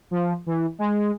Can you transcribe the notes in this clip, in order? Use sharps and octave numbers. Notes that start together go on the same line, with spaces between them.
F3
E3
G#3